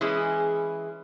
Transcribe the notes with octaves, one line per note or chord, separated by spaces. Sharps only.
E3 G#3 C#4 E4 G#4